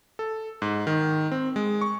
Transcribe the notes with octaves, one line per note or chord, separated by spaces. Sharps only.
A4
G#2
D#3
C4
G#3
C#6